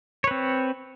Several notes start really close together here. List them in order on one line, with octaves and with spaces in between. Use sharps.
C#5 B4 C4